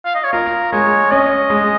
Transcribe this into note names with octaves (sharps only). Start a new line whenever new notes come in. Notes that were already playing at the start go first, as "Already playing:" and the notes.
F5
D#5
C#5
F4 A#4
G#3 C#5
C#4 D#5
G#3